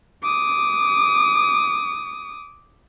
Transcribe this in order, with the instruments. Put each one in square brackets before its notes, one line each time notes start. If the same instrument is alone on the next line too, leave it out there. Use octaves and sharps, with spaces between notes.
[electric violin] D6 D#6